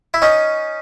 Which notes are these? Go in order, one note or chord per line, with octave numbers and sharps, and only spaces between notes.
E4
C#4 D#4